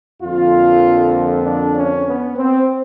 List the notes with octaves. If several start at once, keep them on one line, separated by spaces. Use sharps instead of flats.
F2 D3 F3 A#3 F4
D4
C#4
B3
C4